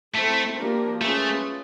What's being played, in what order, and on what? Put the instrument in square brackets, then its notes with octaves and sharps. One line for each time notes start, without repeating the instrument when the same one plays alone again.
[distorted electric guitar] A3 [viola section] C4 E4 A4
[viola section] F3 A#3 D4 G4 A#4
[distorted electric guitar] A3 [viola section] C#4 F4 G#4 B4